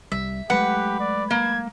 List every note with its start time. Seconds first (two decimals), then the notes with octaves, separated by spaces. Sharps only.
0.12 C2 G3 E5
0.50 F#3 G#3 A3 G4 B4 F#5
1.00 D5
1.31 A#3 G#6